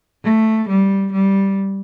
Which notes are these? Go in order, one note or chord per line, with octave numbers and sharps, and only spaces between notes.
A3
G3
G3